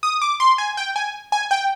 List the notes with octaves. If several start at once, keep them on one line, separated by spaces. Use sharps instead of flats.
D#6
D6
C6
G#5
G5
G#5
G#5
G5